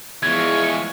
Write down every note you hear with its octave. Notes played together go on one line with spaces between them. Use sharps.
E2 E3 F3 G#3 C#6 G#6